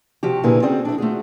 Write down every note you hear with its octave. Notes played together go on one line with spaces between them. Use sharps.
C3 F3 F#4 G4
A#2 D3 E4 G#4 B4 G#5
C4 C#4 F#4 G#4 C5 D5
D4 E4
A3 F4 F#4 G#4